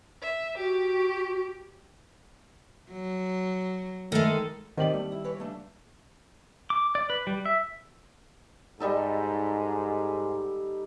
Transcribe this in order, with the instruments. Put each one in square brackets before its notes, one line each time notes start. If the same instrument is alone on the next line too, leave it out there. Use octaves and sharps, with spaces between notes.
[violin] E5
[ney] F#4 [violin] G4
[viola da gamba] F#3
[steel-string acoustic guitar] D#3 G#3 [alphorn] A3 [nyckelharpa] A4
[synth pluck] D#3 D5 [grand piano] C4 G4 F#7 [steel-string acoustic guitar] D#5
[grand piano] G3 [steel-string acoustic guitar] A3
[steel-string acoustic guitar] E4
E3 B4 C#5
C#3 A3 D4
[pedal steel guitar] D6
D5
B4
G3
E5
[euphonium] G#2 [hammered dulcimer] G3 D#4 A4